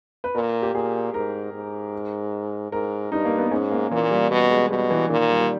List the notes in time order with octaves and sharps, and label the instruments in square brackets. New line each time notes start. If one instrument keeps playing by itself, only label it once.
[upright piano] B4
[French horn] A#2 [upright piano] A#4
[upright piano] G4
[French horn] A#2 [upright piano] G#4
[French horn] G#2 [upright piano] A#4
[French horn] G#2
[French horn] G#2 [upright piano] A#4
[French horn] G2 [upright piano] D#4
[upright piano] A#3
B3
[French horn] G#2 [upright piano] C#4
[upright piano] A#3
[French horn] A#2 [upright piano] E3
[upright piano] G3
[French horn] B2 [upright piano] G3
[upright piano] G#3
[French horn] B2 [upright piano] G3
[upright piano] E3
[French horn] A#2 [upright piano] D#3
[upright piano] G3
G3